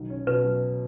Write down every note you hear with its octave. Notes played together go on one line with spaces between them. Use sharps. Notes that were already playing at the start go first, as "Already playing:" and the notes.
Already playing: B1 D#3
C#4
B2 B4
F#3